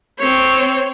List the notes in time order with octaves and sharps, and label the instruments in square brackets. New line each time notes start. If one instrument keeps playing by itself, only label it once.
[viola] C4 C#5